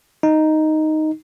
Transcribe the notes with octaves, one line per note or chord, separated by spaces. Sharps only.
D#4